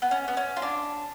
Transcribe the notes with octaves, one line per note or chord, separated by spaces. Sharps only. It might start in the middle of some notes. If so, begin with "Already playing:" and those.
B3
C#4
B3
C#4
F4
D4